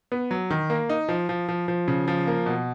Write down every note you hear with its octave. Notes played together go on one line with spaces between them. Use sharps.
B3
F#3
D#3
A#3
D#4
F3
F3
F3
F3
C#3
F3
A#3
B2